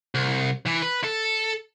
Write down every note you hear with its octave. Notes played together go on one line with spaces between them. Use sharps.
C2
E3
B4
A4